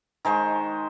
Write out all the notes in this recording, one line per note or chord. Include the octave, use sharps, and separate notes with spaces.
D#3 G#3 C5 C#6